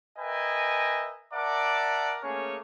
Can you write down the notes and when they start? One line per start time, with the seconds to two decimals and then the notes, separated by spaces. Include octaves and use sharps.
0.18 A#4 B4 D#5 E5 G5 G#5
1.34 A#4 D5 E5 F#5 A5 D6
2.23 A3 A#3 C#4 G#4 C#5